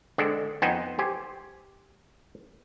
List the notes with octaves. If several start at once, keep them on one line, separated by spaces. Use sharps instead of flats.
D3 G#3 C4 D4 A4
F2 B3 D#4 C5 G5 G#5
G4 C5 G#5